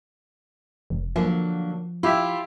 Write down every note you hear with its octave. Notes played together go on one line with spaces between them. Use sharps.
F1
D3 F3 F#3 A#3
E4 F4 G4 E5